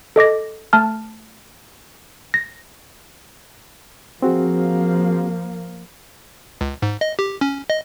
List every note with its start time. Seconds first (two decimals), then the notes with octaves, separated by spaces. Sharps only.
0.16 A4 D#5 D6 A#6
0.73 A3 A5 F6
2.34 A#6
4.22 F3 A#3 C4 F#4 G#4
6.61 C#2
6.82 G#2
7.01 D#5
7.19 G4
7.41 C#4
7.70 D#5